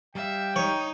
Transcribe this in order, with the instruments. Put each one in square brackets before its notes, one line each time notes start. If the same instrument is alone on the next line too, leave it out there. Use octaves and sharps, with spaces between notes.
[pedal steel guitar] G3 F5 [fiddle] E5 [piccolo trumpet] G5
[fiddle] D#4 [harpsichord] C#5